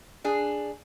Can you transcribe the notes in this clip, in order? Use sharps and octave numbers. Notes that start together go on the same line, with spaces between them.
D4 G#4